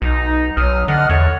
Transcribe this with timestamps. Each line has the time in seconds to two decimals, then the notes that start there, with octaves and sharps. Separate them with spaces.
0.02 B1 D#4
0.57 B1 F#3 D#6 F6
0.88 D3 D#5 F#5 F6
1.09 E2 A4 C#5 F#5